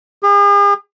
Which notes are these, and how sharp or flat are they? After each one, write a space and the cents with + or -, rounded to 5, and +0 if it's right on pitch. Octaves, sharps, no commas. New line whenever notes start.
G#4 -45